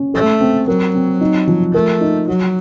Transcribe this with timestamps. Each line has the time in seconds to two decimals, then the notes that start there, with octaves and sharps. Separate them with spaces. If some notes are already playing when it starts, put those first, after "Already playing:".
Already playing: C#4
0.14 A3 A4
0.40 C4
0.68 F#3 A#4
0.94 C4
1.21 D#4
1.47 F3
1.74 A3 A#4
2.01 D#4
2.28 F#3 F#4